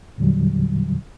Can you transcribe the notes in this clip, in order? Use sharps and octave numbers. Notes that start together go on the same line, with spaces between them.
E2 A#2 D3 F#3 G3